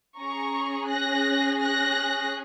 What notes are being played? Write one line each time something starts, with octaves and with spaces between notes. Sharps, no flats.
C#4 G#4 A#5 C#6
F#6 A#6
F#6 A#6